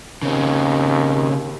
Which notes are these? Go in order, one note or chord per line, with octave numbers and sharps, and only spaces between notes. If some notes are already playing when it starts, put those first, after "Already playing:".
D#2 C#3 C4